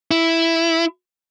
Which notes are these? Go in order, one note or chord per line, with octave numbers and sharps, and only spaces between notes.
E4